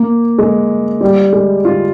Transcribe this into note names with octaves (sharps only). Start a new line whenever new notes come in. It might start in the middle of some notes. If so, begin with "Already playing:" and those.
Already playing: A#3
G#3
G3
G#3
F4